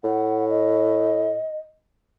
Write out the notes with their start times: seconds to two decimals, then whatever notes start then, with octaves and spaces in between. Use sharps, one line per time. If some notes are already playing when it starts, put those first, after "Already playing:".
0.04 A2 F#5
0.50 D#5